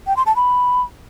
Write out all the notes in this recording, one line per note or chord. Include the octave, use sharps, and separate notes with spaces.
G5
C6
A5
B5